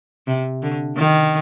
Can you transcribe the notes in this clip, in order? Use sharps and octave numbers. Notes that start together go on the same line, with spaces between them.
C3
D3
D#3